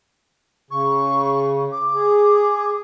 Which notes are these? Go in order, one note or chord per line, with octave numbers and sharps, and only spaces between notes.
C#3 C#6
D6
G#4